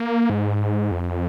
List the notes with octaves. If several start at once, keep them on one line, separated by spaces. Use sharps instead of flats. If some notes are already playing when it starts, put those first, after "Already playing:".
Already playing: A#3
G#2
F2